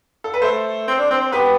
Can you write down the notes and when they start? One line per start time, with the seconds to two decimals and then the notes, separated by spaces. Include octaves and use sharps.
0.24 A4
0.34 B4
0.42 A3 A4 C5
0.88 C4
0.99 D4
1.11 C4
1.21 C4
1.32 B3 G4 B4